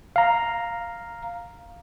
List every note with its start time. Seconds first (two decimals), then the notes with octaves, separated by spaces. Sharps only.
0.16 F5 A#5